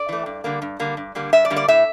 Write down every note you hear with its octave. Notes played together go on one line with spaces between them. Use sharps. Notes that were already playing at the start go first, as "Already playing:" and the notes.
Already playing: D5
E3 A3
G2
D3 G3 A#3
G2
D3 G3 A#3
G2
D3 G3 A#3
G2 E5
D5
D3 G3 A#3
D5
A2 E5